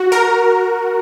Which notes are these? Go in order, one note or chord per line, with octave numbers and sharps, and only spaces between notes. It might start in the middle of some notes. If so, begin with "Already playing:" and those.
Already playing: F#4
A#4